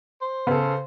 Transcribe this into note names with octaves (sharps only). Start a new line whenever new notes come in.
C5
C#3 B3 A4